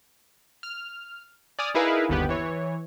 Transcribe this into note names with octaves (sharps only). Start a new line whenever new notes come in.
F6
D5 G#5 D#6 F6
D#4 E4 G#4 A#4 B4 F5
G1 D#2 B3 G4 B4
E3 C#5